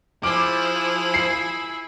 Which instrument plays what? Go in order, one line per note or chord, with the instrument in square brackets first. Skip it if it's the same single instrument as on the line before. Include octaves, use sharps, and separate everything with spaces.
[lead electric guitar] F3 [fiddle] E4 G#4 [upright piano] D6
[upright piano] C7